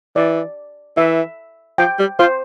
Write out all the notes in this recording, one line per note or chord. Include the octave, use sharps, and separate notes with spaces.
E3 D5
E3 E5
F3 G5
G3
F4 C5